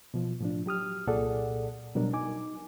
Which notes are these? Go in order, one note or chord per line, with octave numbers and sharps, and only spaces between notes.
B2 F3
A2 F3 D4
F#3 G4 D#6 F6
C2 A#2 G#4 A4 D5 F#5
B2 F#3 G3 D4 A#4
D#4 G#5 D6